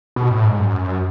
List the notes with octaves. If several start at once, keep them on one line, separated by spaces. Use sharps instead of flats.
B2
A2
G#2
F#2